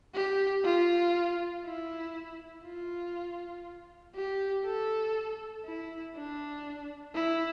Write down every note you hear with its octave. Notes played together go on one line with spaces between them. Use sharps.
G4
F4
E4
F4
G4
A4
E4
D4
E4